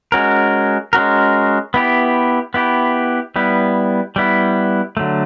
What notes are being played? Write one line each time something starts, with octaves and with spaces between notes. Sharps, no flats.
G#3 C#4 F#4 A#4
G#3 C#4 F#4 A#4
B3 E4 G4
B3 E4 G4
G3 B3 E4
G3 B3 E4
D3 F#3 A3